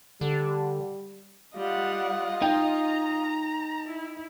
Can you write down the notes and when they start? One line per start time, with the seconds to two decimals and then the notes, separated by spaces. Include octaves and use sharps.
0.21 D3 G3
1.57 G3 F4 D#5 F#5
2.42 D#4 G5 A#5
3.89 E4